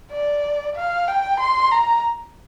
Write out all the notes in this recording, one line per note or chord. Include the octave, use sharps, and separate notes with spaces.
D5
F5
G5
C6
A#5